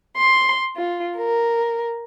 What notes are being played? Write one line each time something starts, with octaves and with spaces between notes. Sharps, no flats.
C6
F4
A#4